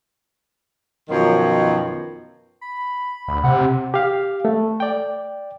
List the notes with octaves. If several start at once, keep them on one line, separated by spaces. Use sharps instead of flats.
F#2 B2 D#3 F3 F#3 F4
B5
D2
C3 F#5
G4 F5
A3
D5 G5